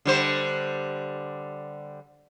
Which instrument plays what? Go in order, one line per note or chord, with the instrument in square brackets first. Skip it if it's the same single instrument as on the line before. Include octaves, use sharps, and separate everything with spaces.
[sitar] D3 G3 C5